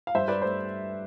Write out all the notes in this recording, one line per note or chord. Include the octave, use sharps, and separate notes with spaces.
F5
G2 C5 E5
B4 D5
A3 C5